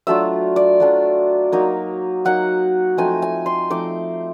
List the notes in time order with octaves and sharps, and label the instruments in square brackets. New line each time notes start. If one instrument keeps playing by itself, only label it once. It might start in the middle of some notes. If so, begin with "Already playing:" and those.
[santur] F#3 A3 D4 F4 E5
D5
F#3 A3 D4 F4
F#3 A#3 D#4
F#3 A#3 D#4 F#5
F3 A3 C4 D#4 G#5
G#5
C6
F3 A3 C4 D#4 D6